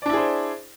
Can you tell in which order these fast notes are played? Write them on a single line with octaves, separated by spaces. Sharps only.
D5 D4 E4 G#4 C5